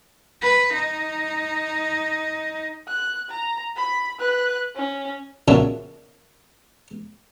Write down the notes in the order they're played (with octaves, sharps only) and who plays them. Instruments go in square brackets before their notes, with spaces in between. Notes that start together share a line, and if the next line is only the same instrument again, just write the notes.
[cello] B4
D#4
[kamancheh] F#6
A#5
B5
B4 F#6
C#4
[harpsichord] A#2 C#3 D4 F#4 E5 G#5